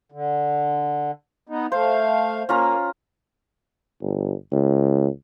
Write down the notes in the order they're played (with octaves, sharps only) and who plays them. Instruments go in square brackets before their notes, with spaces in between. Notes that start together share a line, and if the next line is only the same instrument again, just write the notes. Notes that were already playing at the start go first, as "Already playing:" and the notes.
[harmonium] D3
B3 D#4
[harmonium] A3 F5 [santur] C5
[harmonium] A#3 [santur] C#4 F4 A#5
[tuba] G1
C#2